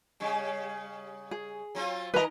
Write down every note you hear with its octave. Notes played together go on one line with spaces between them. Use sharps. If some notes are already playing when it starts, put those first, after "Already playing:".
C#3 G3 C#4
G#4
F#3 C4 F4
D#3 A#4 B4 D#5 A#5